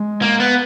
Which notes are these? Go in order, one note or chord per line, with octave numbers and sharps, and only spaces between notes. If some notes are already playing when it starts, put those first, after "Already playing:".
Already playing: G#3
A#3
B3